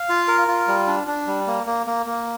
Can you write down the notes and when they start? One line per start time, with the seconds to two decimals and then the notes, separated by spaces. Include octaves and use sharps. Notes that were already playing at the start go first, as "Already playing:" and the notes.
Already playing: F5
0.09 F4
0.28 A#4
0.48 F4
0.67 G3
0.88 D4
1.07 D4
1.27 G3
1.47 A#3
1.67 A#3
1.87 A#3
2.06 A#3